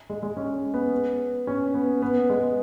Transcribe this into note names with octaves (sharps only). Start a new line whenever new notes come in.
G#3
G#3
C#4
B3
C#4
B3
B3
G#3